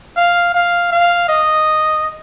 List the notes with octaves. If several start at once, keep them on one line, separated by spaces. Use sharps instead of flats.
F5
F5
F5
D#5